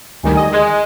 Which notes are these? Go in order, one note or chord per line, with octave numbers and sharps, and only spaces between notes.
D2 D#3 G3 G#5
D#5
G#3